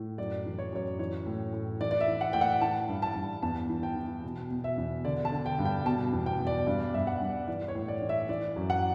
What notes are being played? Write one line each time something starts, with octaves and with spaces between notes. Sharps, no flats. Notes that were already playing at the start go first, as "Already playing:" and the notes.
Already playing: A2
F#2 D5
E3
C#5
F#2 C#5
E3 C#5
A2
A2
E3 D5
D5
E5
E3
F#5
A2 G5
F#5
E3 A5
G2
A5
G2
E2 A5
E3
G5
E3
B2
B2
E5
E2
D3 D5
A5
D3
G5
G2
G5
B2 A5
E2
G5
E2
D5
G2 D5
D5
G2 E5
F#5
G2
E3 D5
C#5
A2
D5
E3
E5
E3 D5
F#2
F#5